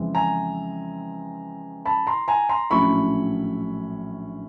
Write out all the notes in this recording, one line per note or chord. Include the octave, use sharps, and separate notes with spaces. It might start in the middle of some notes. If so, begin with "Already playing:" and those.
Already playing: F2 C#3 E3 G#3 C4
G#5 A#5
A5 B5
A#5 C6
G#5 A#5
A#5 C6
A#1 A2 F#3 A3 C#4 B5 C#6